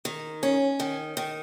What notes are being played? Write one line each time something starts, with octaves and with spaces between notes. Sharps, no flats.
D#3
C#4
D#3
D#3